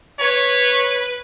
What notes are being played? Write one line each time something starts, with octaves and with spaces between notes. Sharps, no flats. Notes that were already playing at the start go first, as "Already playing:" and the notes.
B4 C#5